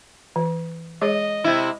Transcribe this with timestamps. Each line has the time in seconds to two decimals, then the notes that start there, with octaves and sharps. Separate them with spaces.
0.36 E3
1.01 G#3 G#4 C#5 D#5
1.44 C3 E4